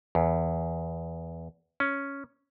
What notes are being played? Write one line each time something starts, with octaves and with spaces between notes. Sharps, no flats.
E2
C#4